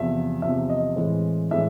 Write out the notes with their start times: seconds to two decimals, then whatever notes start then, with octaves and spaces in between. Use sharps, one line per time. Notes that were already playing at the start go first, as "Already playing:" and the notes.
Already playing: E2 C3 F3 E5
0.42 E2 C3 F3 E5
0.69 D#5
0.96 A2 E3 G#3 C4
1.51 A2 E3 G#3 E5